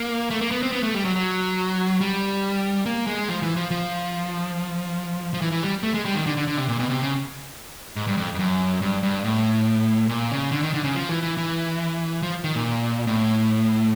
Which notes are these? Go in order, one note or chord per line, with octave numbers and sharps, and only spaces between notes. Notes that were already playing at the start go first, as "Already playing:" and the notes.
Already playing: A#3
A3
A#3
B3
C4
B3
A3
G3
F#3
F#3
G3
A#3
G#3
F3
E3
F3
F3
F3
E3
E3
G3
A3
G#3
G3
D#3
D3
D3
D3
C3
A#2
B2
C3
C#3
G#2
G2
F2
F2
F#2
G2
G2
A2
A#2
C#3
D3
D#3
D3
C#3
F3
E3
E3
E3
F3
D#3
A#2
A2